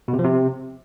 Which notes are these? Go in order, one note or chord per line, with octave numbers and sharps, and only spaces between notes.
B2
C3
F3
C3